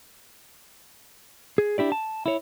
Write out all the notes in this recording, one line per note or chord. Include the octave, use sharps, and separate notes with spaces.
G#4
D4 E4 G4 D5
A5
E4 C#5